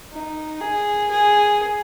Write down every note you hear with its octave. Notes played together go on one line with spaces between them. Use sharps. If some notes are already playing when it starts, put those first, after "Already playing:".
D#4
G#4
G#4